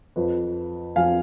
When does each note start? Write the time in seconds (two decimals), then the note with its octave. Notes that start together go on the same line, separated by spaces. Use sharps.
0.16 F2 F3 B4
0.96 F2 F3 F5 G#5